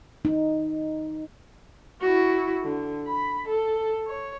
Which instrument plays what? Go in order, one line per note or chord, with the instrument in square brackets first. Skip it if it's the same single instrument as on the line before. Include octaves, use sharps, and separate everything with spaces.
[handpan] D#4
[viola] E4 F#4
D3
B5
A4
C#5